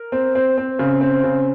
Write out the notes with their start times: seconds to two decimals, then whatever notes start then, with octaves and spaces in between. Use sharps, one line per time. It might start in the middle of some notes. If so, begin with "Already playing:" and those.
Already playing: A#4
0.12 C4
0.35 C4
0.57 C4
0.79 C#3 C5
1.01 C4
1.24 C#3